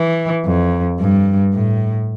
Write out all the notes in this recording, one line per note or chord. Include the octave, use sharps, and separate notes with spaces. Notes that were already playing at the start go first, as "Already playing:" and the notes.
Already playing: E3
F2
G2
A2